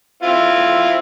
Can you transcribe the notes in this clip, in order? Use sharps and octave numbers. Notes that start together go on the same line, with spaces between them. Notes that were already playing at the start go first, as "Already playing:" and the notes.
C4 E4 F4